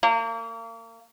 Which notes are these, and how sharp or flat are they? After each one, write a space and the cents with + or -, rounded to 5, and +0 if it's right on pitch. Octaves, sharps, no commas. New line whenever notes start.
A#3 -35